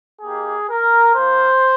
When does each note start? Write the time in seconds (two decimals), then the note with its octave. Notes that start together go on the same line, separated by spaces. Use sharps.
0.22 A#3 D#4 G4 G#4
0.69 A#4
1.15 A#3 F4 C5